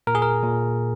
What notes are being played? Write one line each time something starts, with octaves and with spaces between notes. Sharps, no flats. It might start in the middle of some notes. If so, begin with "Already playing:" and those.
A#2 A#4
G#4
A#4
A#2